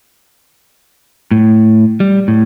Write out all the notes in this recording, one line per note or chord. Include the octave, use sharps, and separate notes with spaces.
A2
G3
A2